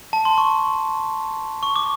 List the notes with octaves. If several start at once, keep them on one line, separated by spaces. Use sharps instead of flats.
A5
C6
C#6
C#6
D6